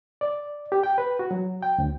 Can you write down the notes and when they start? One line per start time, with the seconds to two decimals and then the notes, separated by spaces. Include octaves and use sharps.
0.21 D5
0.72 G4
0.83 G5
0.98 B4
1.19 F#4
1.31 F#3
1.63 G5
1.78 D2